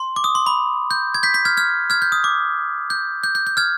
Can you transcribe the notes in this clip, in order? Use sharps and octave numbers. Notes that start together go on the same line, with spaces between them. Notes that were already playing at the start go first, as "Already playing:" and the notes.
Already playing: C6
D6
D#6
C6
B5
G6
G#6
G6 B6
G6 B6
F6 G#6
F6 G#6
F6 G#6
G6
D#6
D6
G6
G6
G6
G6
F6 G#6